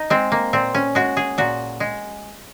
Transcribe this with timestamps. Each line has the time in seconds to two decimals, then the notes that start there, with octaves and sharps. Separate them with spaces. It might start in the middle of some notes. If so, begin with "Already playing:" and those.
Already playing: D#4
0.10 G#3 C4
0.32 A#3
0.53 A#2 C4
0.75 C#4
0.95 G#3 F#4
1.17 G#4
1.38 A#2 F#4
1.80 G#3